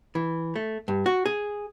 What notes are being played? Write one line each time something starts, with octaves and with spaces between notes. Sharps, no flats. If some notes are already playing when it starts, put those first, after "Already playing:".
E3
A3
G2
F#4
G#4